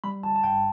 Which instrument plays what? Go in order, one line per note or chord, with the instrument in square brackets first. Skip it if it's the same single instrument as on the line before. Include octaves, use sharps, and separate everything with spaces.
[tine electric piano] G3 B5
G1 A5
A5
G2 G5